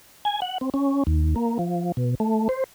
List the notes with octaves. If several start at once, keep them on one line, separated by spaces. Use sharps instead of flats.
G#5
F#5
C4
C#4
D#2
A#3
F3
B2
A3
C5